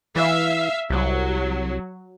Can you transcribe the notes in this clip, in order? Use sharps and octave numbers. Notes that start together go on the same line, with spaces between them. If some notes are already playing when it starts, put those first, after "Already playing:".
E3 E5 F5
C2 F#3